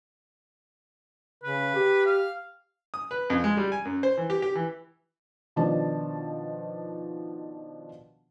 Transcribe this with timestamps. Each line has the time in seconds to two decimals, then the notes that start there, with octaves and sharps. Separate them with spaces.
1.43 C#3 B4
1.75 G4
2.06 F5
2.94 D#6
3.11 B4
3.30 F2
3.44 G#3
3.57 G3
3.72 G#5
3.85 F#2
4.03 C5
4.17 E3
4.30 G4
4.42 G4
4.55 E3
5.56 B2 D#3 F3 D4 A5